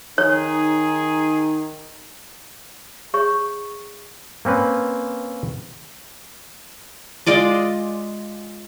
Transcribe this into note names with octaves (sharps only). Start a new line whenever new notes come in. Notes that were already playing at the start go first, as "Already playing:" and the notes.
D#3 D#4 G#4 C#5
G#4 C#5 C#6
A#3 C4 C#4 B4
G#3 F4 D5 D#5